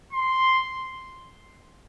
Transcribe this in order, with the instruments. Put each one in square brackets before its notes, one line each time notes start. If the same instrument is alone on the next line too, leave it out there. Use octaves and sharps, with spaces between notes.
[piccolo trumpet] C6